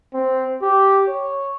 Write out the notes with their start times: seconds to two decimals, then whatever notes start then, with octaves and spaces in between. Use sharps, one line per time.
0.14 C4
0.62 G4
1.08 C#5